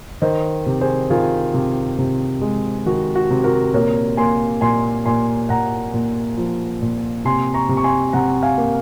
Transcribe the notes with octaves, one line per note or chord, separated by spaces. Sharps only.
D#3 C5 D#5
C3
G#4 C5
D#3 F4 G#4
C3
C3
G#3
D#3 F#4
F#4
C3
F#4 A#4
A#2 A#4 C#5
A#3 G#5 C6
A#2 G#5 C6
A#2 G#5 C6
A#2 F#5 A#5
A#2
F3
A#2
C3 G#5 C6
A#5 C#6
C3
C#6
G#5 C6
C3 F#5 A#5
F5 G#5
A#3